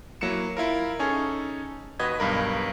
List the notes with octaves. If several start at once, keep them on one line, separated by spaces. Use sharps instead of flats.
F#3 A#3 E4 C#7 E7
E4 F4 A#4
C#4 D#4 G#4 A4 C#5
D#2 F#4 B4 D#5 G#6
B1 G2 A#4 B5